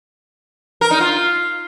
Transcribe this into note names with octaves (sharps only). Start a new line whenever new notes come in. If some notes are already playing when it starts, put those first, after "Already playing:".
A#4
D#4
F4